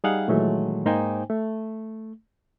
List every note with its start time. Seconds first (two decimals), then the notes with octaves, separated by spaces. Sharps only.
0.04 G3 D#4 G#4 F5 F#5
0.28 A#2 D#3 E3 F#3 G#3 A3
0.85 G#2 A#3 D#4 C5 G5 G#5
1.30 A3